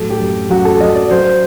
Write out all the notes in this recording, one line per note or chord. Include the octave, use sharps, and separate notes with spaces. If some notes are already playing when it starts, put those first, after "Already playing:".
Already playing: A2 F#3 A4
G4
F#2
F#2 F#4
A4
F#3 D#5
D5
F#3 C5